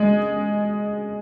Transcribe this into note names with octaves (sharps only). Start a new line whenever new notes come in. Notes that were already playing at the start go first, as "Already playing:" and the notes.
Already playing: G#3